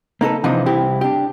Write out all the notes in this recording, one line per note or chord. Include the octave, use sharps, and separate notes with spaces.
A#3 D#4 A4 B4
C3 E3 F3 D4 D#4 F4
C2 C4 E4 G4
D4 G4